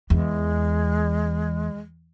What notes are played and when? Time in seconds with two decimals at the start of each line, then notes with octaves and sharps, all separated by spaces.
0.10 E2 G#3